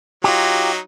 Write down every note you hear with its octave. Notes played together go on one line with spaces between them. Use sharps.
F#3 D#4 F4 G4